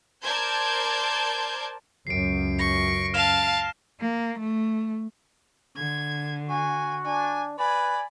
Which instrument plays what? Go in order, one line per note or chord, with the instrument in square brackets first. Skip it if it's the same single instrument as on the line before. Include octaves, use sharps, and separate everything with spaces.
[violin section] A#4 C5 D5 A5 G6 G#6
[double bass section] C#2 F#2 [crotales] C7 D7
[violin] C#6 [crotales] A#6
[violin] F5 A5 [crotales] F6 E7
[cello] A#3
A3
[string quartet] D3 [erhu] G#6
[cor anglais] F#4 [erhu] G#5
[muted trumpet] D4 [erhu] G#5
[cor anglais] B4 [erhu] D5 [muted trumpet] G#5 [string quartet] B5